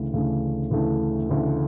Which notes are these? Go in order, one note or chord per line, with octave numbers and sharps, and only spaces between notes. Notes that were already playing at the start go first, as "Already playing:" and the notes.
Already playing: D2 C#3 E3 A3
D2 C#3 E3 A3
D2 C#3 E3 A3
D2 C#3 E3 A3